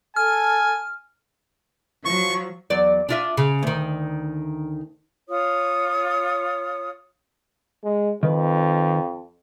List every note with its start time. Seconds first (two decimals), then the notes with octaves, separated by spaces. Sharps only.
0.16 A4 G#5 F6
2.05 F3 F#3 C#6
2.70 E2 F#3 D5
3.09 D4 F4 E5
3.37 C#3
3.63 D2 D#3
5.29 F4 C#5 D#6
7.84 G#3
8.23 F2 D#3 B4